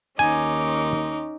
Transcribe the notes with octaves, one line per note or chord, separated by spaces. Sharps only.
D#2 C#4 D#4 G#5 D6